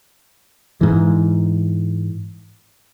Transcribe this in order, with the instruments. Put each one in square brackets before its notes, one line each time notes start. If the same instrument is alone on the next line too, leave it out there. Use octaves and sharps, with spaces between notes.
[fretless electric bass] G#2 E3